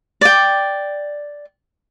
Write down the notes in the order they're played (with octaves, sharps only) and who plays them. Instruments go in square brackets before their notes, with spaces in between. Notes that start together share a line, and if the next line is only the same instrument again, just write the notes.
[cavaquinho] D5 G5